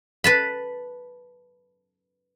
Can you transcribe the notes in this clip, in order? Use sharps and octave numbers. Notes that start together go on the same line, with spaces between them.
B4 A5 B5